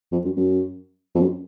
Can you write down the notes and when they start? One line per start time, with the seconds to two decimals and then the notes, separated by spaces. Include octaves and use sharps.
0.12 F2
0.25 F#2
0.37 F#2
1.15 F2
1.21 F#2